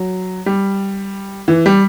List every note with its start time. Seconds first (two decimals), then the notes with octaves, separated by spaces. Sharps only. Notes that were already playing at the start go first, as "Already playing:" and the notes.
Already playing: F#3
0.46 G3
1.48 E3
1.66 G3